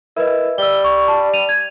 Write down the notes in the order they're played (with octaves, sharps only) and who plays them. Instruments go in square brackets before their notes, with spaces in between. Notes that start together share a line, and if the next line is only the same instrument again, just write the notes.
[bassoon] E4 [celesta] A#4 B4 D#5
[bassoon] G3 [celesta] E6 G7
[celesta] C#6
A5
D#7 F7
G#6